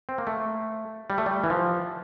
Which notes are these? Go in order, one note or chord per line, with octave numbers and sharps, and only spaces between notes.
C4
A#3
A3
G3
A3
G3
E3
F3